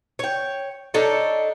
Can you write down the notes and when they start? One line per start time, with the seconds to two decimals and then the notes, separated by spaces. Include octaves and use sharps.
0.19 C#5 G5
0.94 D4 D#4 A4 C#5